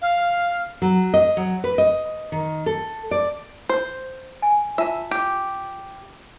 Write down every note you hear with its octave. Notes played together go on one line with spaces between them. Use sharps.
F5
F#3
D#5
F#3
B4
D#5
D#3
A4
D5
C5
G#5
F4 E5 A5
G4